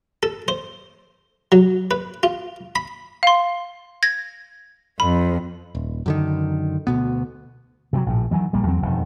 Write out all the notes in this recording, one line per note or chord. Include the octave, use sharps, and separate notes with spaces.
A4
C5
F#3
B4
F4
B5
F5 C6
G#6 A#6
F2 B5
D#1
F#2 D3 D#3
D2 B2 B3
C3 E3 F#3
A#1 A2
D#3 E3 F#3 G3
A#1 G3 A#3
E2 F#3 C4
E1 F2 D#3